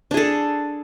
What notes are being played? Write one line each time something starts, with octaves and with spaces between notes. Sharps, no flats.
D4 G#4 A4